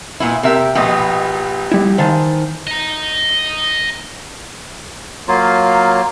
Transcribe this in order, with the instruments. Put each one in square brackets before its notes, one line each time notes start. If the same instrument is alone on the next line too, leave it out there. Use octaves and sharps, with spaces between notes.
[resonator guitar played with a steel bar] A#2 B3 E4
[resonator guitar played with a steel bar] C3 E5 [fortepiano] G4 A#4
[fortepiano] A#1 D#5 [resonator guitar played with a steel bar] B2 G4 B4
[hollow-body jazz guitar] G3 E4
[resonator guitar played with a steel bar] D#3 E3 [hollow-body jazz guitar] C5 F5 A5
[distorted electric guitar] D#5 A#5
[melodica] F#3 A#3 F4